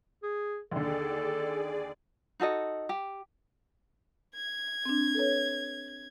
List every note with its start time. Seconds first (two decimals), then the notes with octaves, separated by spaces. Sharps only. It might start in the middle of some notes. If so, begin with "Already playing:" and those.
0.23 G#4
0.71 D#2 D3 G#4 A4 D5
2.40 D#4 F#4 A4 D#5
2.89 G4
4.35 G#6
4.85 C4 D4
5.15 A4 B4 C#5